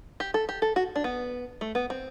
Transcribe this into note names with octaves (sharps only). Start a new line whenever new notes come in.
G4
A4
G4
A4
F#4
D4
B3
A3
B3
C4